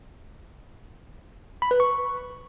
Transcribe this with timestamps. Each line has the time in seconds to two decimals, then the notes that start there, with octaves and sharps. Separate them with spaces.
1.62 B5
1.71 B4
1.80 C#6